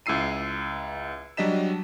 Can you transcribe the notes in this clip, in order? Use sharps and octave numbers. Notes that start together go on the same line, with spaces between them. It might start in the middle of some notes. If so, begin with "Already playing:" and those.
C#2 E4 E6 C7 D#7
F#3 G3 D4 D#5 B6 E7